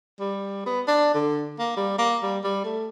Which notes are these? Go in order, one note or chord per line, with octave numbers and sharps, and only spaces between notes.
G3
B3
D4
D3
A#3
G3
A#3
G3
G3
A3